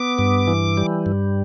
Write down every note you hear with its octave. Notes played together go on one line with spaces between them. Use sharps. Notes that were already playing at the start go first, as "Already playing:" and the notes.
Already playing: B3 D6
G2
E3
G3
G2